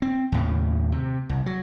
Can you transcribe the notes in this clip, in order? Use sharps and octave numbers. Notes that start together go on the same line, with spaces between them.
C4
D#2 A2 C#3
C3
C2
F#3